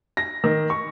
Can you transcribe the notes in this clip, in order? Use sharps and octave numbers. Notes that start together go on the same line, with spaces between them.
A#6
D#3
C#6